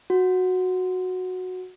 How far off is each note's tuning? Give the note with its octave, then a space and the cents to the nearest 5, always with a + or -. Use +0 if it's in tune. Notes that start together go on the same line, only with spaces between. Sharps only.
F#4 -10